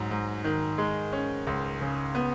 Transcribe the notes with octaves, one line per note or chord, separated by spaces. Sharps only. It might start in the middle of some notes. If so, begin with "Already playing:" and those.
Already playing: G#2 F#3
G#2
D#3
G#3
C#4
C#2
C#3
B3